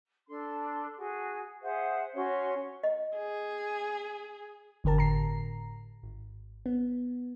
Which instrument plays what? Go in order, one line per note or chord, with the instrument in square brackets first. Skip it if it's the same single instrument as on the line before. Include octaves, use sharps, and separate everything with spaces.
[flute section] D4 A4 C6
F#4 G#4
G#4 C5 E5 F#5
C#4 F#4 C#5 C6
[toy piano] D#5
[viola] G#4
[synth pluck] G1 D3 G4 A#4 A5
A1 A#5 C7
G#1
B3